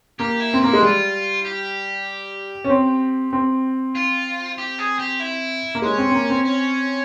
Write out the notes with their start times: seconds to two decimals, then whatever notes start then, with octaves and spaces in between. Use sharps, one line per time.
0.19 A#3 G4
0.40 E4
0.54 C4
0.61 A#3 E4
0.73 G#3
0.82 G3 F4
1.45 G4
2.65 C#4
2.70 C4
3.33 C4
3.95 F4
4.58 G4
4.79 G#4
4.99 G4
5.20 E4
5.75 A#3
5.82 G#3 C#4
5.98 C4
6.10 C4
6.15 A#3
6.30 C4
6.45 C#4